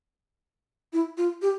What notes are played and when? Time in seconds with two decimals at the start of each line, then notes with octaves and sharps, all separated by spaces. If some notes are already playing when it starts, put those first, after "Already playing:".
0.93 E4
1.18 F4
1.42 G4